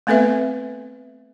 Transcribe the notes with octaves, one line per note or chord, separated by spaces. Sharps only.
A3 B3 C4 A4 B4 E5